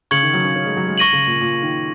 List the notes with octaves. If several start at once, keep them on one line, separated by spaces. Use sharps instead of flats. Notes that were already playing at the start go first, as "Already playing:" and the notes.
C#3 C#6 G#6 C#7 F#7
D#3
F#3
C#4
C#4
G#3
F#3
G#3
C#6 A#6 D#7 F#7
C#3
A#2
A#2
D#3